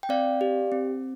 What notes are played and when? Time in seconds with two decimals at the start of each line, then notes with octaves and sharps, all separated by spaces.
0.03 G5
0.09 C4 D5 F5
0.41 G4
0.72 C4